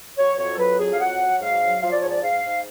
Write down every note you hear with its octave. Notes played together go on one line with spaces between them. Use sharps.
F#3 C#5
F2 C#5
A4
F#3 B4
F2 G#4
F5
F#3 F#5
F#3
G#2 F5
F#3
F3 F5
D5
G#2 C#5
D5
G#2 F5
G#2